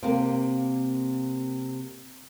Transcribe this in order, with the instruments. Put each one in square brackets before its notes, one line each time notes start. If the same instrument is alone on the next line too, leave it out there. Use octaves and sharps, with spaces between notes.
[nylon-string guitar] C3 A#3